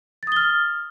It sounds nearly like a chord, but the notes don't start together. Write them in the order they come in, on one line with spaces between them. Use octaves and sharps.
A6 D#6 G7 F6